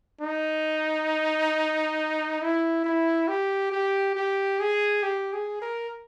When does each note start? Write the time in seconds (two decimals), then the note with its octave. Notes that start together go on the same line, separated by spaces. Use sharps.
0.21 D#4
2.41 E4
2.84 E4
3.28 G4
3.72 G4
4.15 G4
4.60 G#4
5.03 G4
5.33 G#4
5.62 A#4